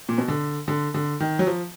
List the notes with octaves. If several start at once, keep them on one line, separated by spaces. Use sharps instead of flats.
A#2
B2
D3
D3
D3
D#3
F#3
F3